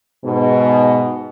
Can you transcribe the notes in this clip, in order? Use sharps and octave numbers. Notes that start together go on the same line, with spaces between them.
G#2 B2